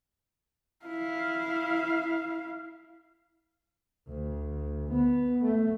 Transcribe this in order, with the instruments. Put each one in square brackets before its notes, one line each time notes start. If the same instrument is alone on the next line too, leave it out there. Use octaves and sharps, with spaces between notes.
[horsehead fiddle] E4 F5
[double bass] D2
B3
A3